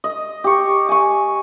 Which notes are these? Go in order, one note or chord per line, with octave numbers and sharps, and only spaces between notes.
D#5
G4 C#6
G#5 C#6